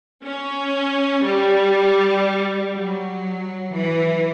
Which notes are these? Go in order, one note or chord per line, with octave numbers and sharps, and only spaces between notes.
C#4
G3
F#3
E3